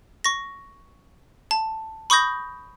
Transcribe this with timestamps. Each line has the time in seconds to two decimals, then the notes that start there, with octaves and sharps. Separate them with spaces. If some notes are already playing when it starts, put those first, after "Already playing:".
0.24 C#6 A#6
1.51 A5
2.10 B5 C#6 D#6 G6 A#6